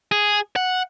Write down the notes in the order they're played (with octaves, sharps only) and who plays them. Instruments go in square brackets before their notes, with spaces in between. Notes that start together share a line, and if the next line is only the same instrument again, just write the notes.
[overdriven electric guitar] G#4
F#5